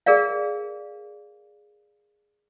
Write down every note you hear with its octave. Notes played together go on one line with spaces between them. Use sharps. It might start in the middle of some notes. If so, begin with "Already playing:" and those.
G#4 A#4 D5 F5